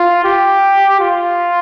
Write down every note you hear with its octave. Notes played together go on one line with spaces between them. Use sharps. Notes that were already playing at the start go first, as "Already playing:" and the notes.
Already playing: F4
G4
F4